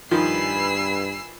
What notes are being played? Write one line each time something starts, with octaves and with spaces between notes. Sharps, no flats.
G2 D#3 F3 B4 G#5 B5 E6 C7